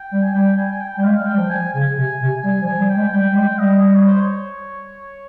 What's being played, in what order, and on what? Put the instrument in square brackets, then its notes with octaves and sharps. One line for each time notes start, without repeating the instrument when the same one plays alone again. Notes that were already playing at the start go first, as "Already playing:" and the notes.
Already playing: [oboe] G5
[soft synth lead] G3
[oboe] G#5
[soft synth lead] G3 [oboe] G5
[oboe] G#5
G#5
G5
[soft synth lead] G3 [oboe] G5
[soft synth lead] G#3 [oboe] F5
[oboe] G5
[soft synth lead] G3
F3
[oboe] G#5
[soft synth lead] C#3 [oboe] G#5
[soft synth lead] C3
C3
[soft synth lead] G3 [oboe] G#5
[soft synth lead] F3
[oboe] G#5
[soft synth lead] G3
[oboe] G5
[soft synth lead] G#3
[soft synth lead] G3 [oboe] G5
[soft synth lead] G3
[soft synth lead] G#3 [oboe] G5
[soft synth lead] G3 [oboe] D#5
[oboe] D#5
C#5
C5
C#5